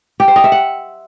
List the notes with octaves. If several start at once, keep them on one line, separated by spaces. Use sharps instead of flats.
G4
C5
D#5
E5
F#5